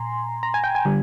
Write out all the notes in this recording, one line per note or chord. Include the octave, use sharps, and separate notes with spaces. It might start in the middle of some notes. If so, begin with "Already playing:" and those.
Already playing: A#2 G#5 A#5 C6
A#5
G#5
G5
G#5
D3 G3